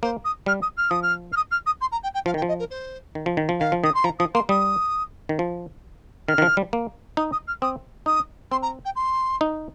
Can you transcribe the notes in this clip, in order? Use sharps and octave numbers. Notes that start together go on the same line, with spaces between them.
A#3 C5
D#6
G3 F6
D#6
F6
F3 D#6
F6
F6
D#6
F6
D#6
C6
A#5
G5
G5
F3 F5
D#3 G5
F3
D#5
A#4
C5
D#3
F3
D#3
F3
D#3 F5
F3
D#3 D#6
C6
F3 A#5
F3 D#6
A#3 C6
G3 D#6
D#3
F3
D#3 F6
D#3
F3
G3
A#3
D#4 D#6
D#6
F6
C4 D#6
D#4 D#6
C4 C6
A#5
G5
C6
D#4